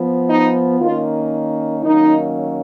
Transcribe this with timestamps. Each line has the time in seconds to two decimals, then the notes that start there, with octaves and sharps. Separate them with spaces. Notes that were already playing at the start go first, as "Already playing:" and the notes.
Already playing: F3 B3
0.30 D#4
0.81 D#3 A#3 C#4 F4
1.84 D#3 F#3 A#3 C#4 D#4